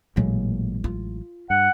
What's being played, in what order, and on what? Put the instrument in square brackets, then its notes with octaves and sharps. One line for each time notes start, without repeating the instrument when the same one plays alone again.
[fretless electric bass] A1 F#3 G#3 [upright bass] A#2 A#3
[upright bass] F4
[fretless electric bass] G2 [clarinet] F#5